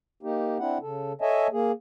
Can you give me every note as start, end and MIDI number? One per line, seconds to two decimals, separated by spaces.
0.23 0.58 58
0.23 0.58 63
0.23 0.58 67
0.59 0.78 60
0.59 0.78 62
0.59 0.78 64
0.59 0.78 78
0.82 1.13 49
0.82 1.13 69
1.21 1.47 69
1.21 1.47 73
1.21 1.47 75
1.21 1.47 76
1.21 1.47 80
1.21 1.47 81
1.52 1.72 58
1.52 1.72 68